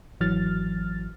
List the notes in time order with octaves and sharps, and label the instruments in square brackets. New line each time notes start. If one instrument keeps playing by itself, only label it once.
[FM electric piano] G#1 E3 F#3 F6 A6